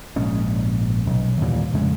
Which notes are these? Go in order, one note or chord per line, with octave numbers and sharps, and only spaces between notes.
A#1 G#2 G#3 C#4
B1
D#2 A#2 E3 G3
F2 C#3 G#3 A3